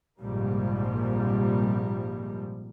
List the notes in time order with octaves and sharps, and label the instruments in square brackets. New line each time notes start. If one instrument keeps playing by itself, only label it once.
[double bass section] A#1 G#2 C3 F3 G3 A#3